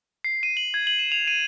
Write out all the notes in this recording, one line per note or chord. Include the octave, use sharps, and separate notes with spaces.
C7
D#7
F#7
G#6
F#7
E7
F7
D#7